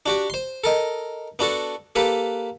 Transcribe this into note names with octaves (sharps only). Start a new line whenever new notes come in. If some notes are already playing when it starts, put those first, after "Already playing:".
D4 F#4 G4
C5 C6
A4 A#4 D#5
B3 D4 F#4 A4
A#3 G4 A4 B4